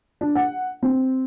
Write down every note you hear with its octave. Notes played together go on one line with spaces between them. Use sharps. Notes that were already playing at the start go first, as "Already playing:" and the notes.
D4
F#5
C4